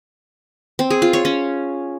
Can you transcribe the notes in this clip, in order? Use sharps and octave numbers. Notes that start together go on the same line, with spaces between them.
C4
G#4
F4
C#5
C#4